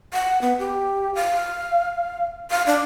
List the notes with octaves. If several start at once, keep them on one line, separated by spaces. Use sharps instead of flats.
F#5
B3
G4
F5
F5
D4